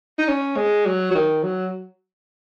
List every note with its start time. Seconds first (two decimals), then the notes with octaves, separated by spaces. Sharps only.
0.19 D#4
0.28 C#4
0.57 G#3
0.86 F#3
1.11 F#3
1.15 D#3
1.43 F#3